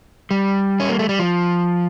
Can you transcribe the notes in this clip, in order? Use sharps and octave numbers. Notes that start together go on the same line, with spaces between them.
G3
C#4
A#3
A3
G3
F3